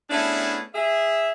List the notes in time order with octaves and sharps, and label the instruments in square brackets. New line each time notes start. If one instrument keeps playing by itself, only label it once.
[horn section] A3 B3 C#4 D4 E4 G#4
G#4 E5